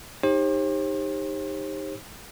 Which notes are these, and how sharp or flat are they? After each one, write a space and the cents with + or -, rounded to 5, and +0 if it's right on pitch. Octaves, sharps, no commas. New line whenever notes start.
D#4 +0 G4 +25 C5 +40